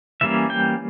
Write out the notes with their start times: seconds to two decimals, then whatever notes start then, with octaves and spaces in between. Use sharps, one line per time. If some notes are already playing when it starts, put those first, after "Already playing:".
0.21 E3 G3 A#3 C#4 E5
0.50 G5